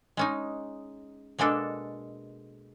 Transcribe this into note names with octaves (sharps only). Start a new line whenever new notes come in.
G#3 C#4 D#4
B2 G#3 A#3 D4 A4